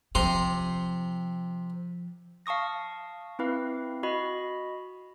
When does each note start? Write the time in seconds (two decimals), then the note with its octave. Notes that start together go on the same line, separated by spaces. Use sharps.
0.15 C3 F3 A#5 C6
2.46 F5 A5 C#6 D#6 A#6
3.39 C4 E4 B4 F5
4.03 F#4 D#5 B5